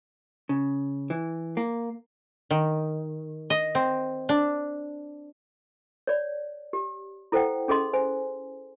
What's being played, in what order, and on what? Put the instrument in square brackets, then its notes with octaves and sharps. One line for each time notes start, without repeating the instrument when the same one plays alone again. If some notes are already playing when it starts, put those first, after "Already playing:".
[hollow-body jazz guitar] C#3
E3
A#3
[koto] D#3
D#5
C4
D4
[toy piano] C#5 D5
G4
E4 A4 C5 F#5 G5
C#4 G#4 A4 D#5 C6
C5 G#5